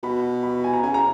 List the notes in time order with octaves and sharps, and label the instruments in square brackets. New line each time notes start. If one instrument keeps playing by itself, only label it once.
[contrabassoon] B2 [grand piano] B5
[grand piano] B5
G#5
A#5
[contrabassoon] C#3 [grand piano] G#5
[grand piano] A#5